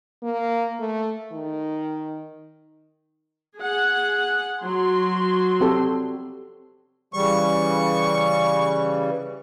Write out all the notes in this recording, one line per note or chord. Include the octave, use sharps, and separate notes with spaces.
A#3
A3
D#3
G#4 F#5
F#3 C6
C4 G4 A4
C#3 E3 G3 C#6